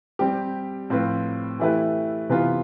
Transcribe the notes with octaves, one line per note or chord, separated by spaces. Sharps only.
G3 C4 G4
A2 F3 C4 F4 B4
E3 A3 E4 G4 B4
C3 E3 B3 F4